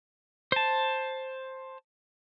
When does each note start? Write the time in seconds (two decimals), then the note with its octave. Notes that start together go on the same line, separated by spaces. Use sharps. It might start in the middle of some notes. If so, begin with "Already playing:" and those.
0.52 C5 A5